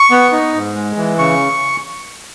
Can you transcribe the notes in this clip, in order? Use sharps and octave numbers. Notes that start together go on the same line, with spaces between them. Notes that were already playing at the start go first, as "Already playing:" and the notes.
Already playing: C#6
B3
D#4
G#2
G#3
E3
C#3 C#6